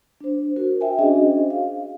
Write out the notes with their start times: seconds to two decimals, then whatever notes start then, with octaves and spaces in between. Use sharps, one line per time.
0.20 D4 C5
0.56 F#4 A#4
0.81 E5 G5 G#5
0.99 C#4 D4 F#4 G#4 C5 D#5
1.50 F5